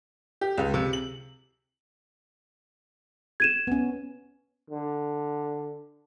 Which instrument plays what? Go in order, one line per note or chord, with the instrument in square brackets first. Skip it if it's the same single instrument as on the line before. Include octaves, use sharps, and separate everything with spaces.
[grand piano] G4
C#2
C3
F#7
[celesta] G#6 D#7 E7
[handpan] B3 C#4
[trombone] D3